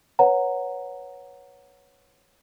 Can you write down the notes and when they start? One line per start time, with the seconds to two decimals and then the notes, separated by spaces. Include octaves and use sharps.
0.19 B4 C#5 F#5 A#5